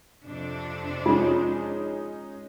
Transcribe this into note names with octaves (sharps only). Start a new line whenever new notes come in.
F2 C3 D4
G#3 C#4 D#4 F4